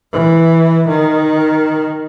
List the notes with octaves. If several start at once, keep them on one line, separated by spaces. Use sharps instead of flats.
E3
D#3